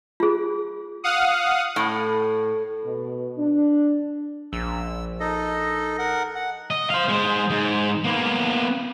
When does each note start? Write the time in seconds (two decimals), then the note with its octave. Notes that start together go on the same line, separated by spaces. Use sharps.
0.20 F4 G#4
1.04 F5 F#5 D#6
1.76 A2
2.85 B2
3.38 D4
4.53 A#1 E6
5.20 D#4 A4 D#5
5.99 A#4 F#5
6.35 F#5
6.70 D#5
6.90 C5 F5
7.09 G#3 C5
7.50 G#2
8.04 A#3 B3